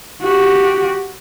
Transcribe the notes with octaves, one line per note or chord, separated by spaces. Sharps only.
F#4 G4